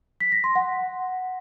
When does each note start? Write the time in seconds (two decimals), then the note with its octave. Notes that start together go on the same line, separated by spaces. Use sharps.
0.20 B6
0.32 A#6
0.44 C6
0.55 F#5